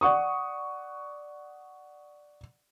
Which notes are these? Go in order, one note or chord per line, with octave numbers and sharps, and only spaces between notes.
D5 F#5 C#6 D#6